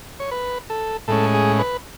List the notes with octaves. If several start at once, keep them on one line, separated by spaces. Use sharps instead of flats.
C#5
B4
A4
A2 G#3 C#4 A4
G#4
B4